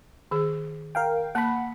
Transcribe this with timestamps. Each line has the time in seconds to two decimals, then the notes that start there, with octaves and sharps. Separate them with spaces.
0.31 D#3 G#4
0.95 A#4 F5 G5
1.35 A#3 F#5 A5 B5